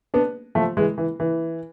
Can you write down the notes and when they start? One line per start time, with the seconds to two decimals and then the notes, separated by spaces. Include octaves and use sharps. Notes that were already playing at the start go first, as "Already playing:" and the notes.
0.14 B3 D4
0.55 F3 A3
0.77 E3 G#3
0.98 E3
1.20 E3